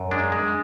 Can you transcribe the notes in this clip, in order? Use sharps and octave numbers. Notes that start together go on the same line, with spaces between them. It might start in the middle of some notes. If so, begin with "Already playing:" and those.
Already playing: F#2
G#3 D4
G#3